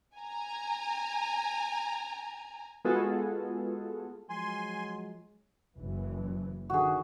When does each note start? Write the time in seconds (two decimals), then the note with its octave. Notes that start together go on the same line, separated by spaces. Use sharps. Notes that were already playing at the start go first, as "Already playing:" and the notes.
0.16 G#5 A#5
2.85 G#3 B3 F4 F#4 G#4 A4
4.30 F3 F#3 G#3 G#5 C6
5.76 F#1 E3
6.70 D3 D#3 F#4 G#4